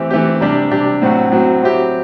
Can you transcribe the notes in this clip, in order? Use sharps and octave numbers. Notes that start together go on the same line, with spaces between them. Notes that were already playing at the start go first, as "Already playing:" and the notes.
Already playing: E3 A3 C4 G4
E3 A3 C4 G4
C3 G3 D4 G4
C3 G3 D4 G4
A2 F#3 C4 F#4
A2 F#3 C4 F#4
F#3 C4 E4 G4